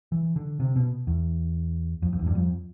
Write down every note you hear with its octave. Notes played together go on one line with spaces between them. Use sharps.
E3
D3
C3
B2
E2
F2
F2
E2
G2
F2